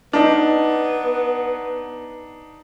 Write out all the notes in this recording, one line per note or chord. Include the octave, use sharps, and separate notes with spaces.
B3 D4 D#4